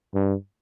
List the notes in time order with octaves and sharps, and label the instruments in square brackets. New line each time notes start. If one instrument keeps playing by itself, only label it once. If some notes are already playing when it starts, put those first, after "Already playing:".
[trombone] G2